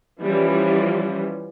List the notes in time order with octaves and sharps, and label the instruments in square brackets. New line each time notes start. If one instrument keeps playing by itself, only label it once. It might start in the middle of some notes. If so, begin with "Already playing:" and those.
[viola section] E3 F3 G3 C#4